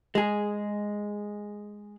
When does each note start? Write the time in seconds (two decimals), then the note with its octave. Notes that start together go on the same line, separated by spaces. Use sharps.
0.15 G#3 G#4